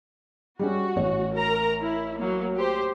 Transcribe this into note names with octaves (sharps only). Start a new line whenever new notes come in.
G3 G#3 C#4 F#4
A1 C#5
A#4 A#5
E4
F#3 A#3
G4 C5